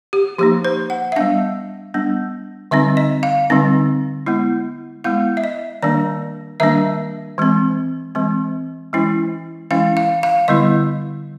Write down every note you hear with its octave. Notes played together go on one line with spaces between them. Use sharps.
G4
F3 A#3 D#4 G4
C5
F#5
E5
G3 B3 D4 F5
G3 B3 D4
D3 G3 C4 D#4 E5
D#5
F5
D3 G3 C4 D#4
G#3 B3 E4
G#3 B3 E4 F5
E5
D#5
D#3 G3 A#3 D4 D5
D#3 G3 A#3 D4 E5
E3 G#3 C4
E3 G#3 C4
E3 G#3 C#4 E4
E3 G#3 C#4 E4 F5
F5
F5
D3 G3 B3 E4 D#5